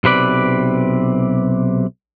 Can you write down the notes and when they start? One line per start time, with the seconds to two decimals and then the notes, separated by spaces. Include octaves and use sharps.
0.04 B1 C3 B4 D5